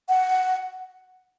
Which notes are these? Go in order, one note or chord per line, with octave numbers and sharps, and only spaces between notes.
F#5